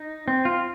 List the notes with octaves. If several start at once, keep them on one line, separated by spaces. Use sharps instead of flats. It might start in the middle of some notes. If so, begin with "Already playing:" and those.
Already playing: D#4
C4
F4